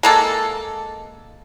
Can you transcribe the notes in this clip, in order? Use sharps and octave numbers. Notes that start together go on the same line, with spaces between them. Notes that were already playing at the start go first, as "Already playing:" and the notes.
G#3 A#3 A4